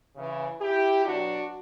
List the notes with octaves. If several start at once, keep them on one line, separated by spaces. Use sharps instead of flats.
C#3 E3
E4 G4
B2 F#3 D4 F#4